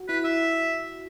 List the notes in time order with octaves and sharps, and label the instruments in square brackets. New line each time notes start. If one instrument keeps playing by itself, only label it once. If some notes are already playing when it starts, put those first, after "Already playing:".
Already playing: [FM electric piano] F#4
[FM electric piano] E4 [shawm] B4
[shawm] E5